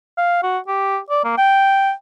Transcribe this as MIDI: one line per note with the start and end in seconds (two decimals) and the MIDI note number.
0.18 0.41 77
0.43 0.59 66
0.68 0.99 67
1.10 1.21 74
1.24 1.34 58
1.38 1.92 79